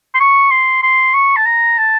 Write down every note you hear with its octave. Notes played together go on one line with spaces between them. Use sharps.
C6
C#6
C6
C6
C#6
A5
A#5
A5